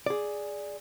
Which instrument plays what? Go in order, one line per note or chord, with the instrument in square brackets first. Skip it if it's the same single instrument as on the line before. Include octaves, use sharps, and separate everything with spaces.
[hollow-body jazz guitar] G#4 D5